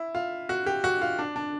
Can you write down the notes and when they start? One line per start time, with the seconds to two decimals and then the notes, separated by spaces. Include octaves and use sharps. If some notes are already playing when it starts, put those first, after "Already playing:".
Already playing: E4
0.15 F4
0.49 F#4
0.66 G4
0.84 F#4
1.01 F4
1.19 D4
1.36 D4